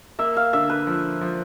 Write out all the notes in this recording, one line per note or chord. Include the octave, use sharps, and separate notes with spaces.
A#3 E5
F5
D3 E5
B4
F3
F3